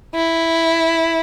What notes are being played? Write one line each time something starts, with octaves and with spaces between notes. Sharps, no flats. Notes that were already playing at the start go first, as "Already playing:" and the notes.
E4